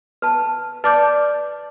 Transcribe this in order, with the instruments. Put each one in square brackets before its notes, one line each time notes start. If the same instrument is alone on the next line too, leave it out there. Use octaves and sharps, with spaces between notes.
[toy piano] B4 A5
[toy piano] B4 [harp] D5 [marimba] A5 D6 G6